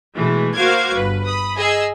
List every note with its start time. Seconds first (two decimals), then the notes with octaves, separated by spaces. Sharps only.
0.15 B2 E3 G#3 A3
0.55 A#3 F#4 C5 F5 D6 G#6
0.93 G1 B4
1.26 B5 D#6
1.56 G#4 D#5 E6